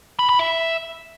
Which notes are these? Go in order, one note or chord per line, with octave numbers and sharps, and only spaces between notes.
B5
B5
E5